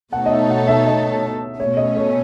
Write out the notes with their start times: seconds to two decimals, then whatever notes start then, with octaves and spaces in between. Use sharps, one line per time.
0.13 B2 A3 D#4 A4 C#5 F#5
0.26 D#5
0.31 E5
0.50 F#5
0.68 E5
0.87 D#5
1.59 B2 A3 C#4 C#5
1.77 D#5
1.96 C#5